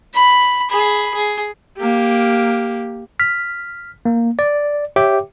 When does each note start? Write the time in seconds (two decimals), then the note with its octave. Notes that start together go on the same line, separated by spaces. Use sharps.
0.14 B5
0.71 G#4 B5
1.14 G#4
1.78 A#3 G4
3.19 F6 B6
4.05 A#3
4.39 D5
4.96 G4 C#5 E5 G5 D6